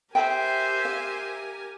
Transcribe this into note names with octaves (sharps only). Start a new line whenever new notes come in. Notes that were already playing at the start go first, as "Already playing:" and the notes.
G4 A#4 C5 E5 G5 G#5
F5